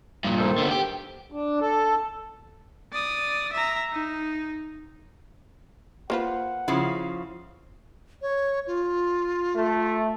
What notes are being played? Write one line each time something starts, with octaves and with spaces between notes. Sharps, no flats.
G2 A#2
D#3 A4 C5
D3 B3
G4
D4
A4
D5 D#6
E5 A#5
D#4
A#3 F4 B4 C5 F#5
C#3 F3 E4 C#5
C#5
F4
A3